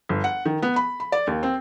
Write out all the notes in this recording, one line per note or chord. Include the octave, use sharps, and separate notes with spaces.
G1
F#5
D#3
B3
B5
B5
D5
D#2
C4